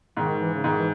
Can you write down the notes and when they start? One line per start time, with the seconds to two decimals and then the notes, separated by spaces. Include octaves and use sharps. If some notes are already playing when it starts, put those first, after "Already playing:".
0.17 G#2 D#3
0.40 E3
0.53 C#3
0.64 G#2 D#3
0.79 E3